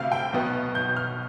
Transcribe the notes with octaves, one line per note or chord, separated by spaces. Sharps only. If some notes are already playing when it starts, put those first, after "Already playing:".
Already playing: D2 C3 A3 E5 F5
G5
B1 B2 B3
G6
F6